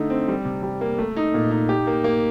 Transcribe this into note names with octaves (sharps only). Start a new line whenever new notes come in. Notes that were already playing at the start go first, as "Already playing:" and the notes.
Already playing: D3 A3 D#4
C4
G3
C3
G3
A#3
A3
D#4
A#2
D#4
G4
A#3
A#3